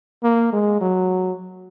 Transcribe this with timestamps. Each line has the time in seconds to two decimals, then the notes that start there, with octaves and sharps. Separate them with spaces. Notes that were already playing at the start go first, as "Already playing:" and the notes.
0.23 A#3
0.52 G#3
0.81 F#3